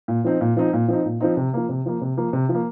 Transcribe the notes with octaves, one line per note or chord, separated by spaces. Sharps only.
A#2
F3 C4 D#4
A#2
F3 C4 D#4
A#2
F3 C4 D#4
A#2
F3 C4 D#4
C3
F3 A#3
C3
F3 A#3
C3
F3 A#3
C3
F3
A#3